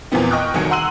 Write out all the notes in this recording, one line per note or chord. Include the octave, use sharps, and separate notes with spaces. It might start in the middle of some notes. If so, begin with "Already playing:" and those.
E2 A#2 E3 F3 B3 C4
D#5 G5 C#6 D#6 F6 F#6
F1 C2 D#3 F#3 G#5 C#7
F#5 A#5 C6 E6 D#7 F#7